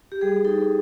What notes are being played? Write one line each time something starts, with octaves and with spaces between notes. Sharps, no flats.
G4
G3 G#4
D#4 A4